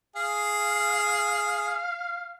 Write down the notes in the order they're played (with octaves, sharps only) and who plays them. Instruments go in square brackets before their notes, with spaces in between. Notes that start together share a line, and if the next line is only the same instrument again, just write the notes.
[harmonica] G#4 [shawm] F5